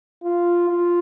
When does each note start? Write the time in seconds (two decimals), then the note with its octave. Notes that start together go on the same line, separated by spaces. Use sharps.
0.24 F4
0.69 F4